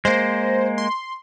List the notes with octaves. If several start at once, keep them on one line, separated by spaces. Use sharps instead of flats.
G#3 A#3 C5
C6